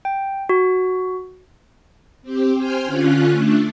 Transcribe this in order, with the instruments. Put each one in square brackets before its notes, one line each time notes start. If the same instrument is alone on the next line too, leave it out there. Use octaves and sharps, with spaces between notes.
[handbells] G5
F#4
[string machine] C4 G4
C5 G5 G#5 F6
D3 C#4 F4 F#6
A3 D4